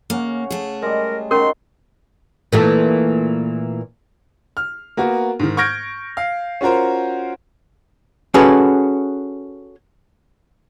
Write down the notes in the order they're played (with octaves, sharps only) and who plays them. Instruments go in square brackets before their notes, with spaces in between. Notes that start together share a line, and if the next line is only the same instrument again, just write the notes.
[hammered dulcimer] C#3 C#4 F#5 [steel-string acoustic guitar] A#3
[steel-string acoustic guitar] A3 G#4
[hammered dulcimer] G3 G#3 [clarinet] A#4
[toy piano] C#4 A#4 [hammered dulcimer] D#4 F4 F#4 [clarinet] C6
[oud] A#2 E3 A3
[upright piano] F6
A#3 B3 F#4
G#2 D#3
C#6 F6 G6 G#6 A#6 D7
F5
C#4 F4 F#4 A#4 C5
[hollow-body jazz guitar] C#4 F#4 G#4 A4 B4